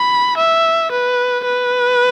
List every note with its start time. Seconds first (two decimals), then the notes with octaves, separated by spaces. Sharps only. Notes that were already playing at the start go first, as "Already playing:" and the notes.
Already playing: B5
0.38 E5
0.92 B4
1.45 B4